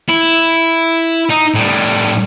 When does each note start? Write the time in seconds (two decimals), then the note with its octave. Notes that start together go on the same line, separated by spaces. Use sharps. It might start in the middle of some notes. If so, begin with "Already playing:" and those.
0.09 E4
1.30 D#4
1.55 A2 G3